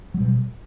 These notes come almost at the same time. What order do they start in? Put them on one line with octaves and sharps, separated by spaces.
F#3 G3 B2